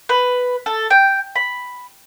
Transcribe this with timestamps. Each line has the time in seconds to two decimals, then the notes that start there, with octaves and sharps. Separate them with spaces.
0.09 B4
0.66 A4
0.90 G5
1.35 B5